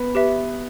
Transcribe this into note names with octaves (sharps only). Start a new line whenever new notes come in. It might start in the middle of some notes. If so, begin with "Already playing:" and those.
Already playing: B3
G4 B4 E5